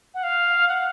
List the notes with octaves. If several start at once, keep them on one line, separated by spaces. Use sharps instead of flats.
F#5
F5
F#5